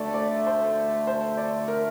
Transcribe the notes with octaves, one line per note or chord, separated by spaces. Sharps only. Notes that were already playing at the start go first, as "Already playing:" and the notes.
Already playing: D2 D3 A3 D5
D5
C5
C5
D5
A#4